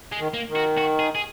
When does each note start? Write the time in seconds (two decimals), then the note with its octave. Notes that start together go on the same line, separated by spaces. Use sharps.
0.12 G#3
0.19 D#3
0.34 A#3
0.49 D#3
0.56 F#4
0.78 F#4
0.99 G#4
1.15 G#4